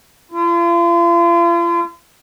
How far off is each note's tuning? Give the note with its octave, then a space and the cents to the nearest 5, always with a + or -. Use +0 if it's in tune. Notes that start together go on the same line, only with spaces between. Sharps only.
F4 -40